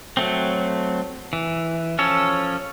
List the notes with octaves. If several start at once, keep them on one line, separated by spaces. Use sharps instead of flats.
F#3 A3 C4
E3
F3 C#4 A4 C#5